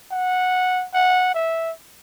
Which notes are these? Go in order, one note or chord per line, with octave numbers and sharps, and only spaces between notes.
F#5
F#5
E5